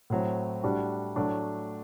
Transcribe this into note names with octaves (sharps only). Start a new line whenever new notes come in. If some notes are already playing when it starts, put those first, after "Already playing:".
A2 F#3 C4
A2 G3 D4 F#4
A2 F#3 A3 D4 F#4